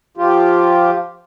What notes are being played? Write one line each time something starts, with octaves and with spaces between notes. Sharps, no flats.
F3 F4 G4